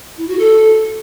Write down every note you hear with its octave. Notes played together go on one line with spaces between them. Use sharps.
E4
F#4
A4